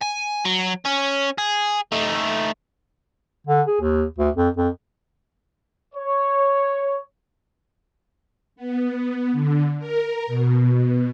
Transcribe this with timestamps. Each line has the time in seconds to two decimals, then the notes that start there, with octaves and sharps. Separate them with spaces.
0.02 G#5
0.45 F#3
0.85 C#4
1.38 G#4
1.92 A3 D#4
3.47 D3
3.67 G#4
3.81 D#2
4.18 D2
4.37 F2
4.57 F2
5.95 C#5
8.56 B3
9.33 D3
9.79 A#4
10.27 B2